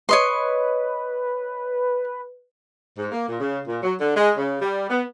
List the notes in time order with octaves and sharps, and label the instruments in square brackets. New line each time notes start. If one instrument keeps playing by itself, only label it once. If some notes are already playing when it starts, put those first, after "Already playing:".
[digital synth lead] B4 [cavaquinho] C#5 D#5 C6
[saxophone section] G#2
A#3
A#2
C#3
A#2
F#3
D3
G#3
C#3
G3
B3